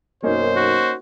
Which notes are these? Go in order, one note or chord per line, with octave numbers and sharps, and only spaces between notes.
B1 F#2 A#3 C#4 D#4 C5
F#4